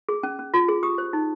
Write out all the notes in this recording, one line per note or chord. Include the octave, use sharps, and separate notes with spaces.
G#4
C#4
C#4
F4
G#4
G4 D#6
C5
D#4